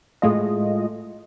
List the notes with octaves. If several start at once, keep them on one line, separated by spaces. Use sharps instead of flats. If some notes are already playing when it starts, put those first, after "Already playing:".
A2 G#3 A3 F4 D#5